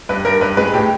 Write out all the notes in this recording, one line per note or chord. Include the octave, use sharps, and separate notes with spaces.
G2 B4
G2 A#4
G2 B4
G#3 B4
A2 G4